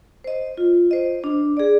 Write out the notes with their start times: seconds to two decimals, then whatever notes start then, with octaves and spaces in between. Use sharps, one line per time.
0.24 C5 D#5
0.57 F4
0.91 C5 D#5
1.24 D4
1.57 G#4 D5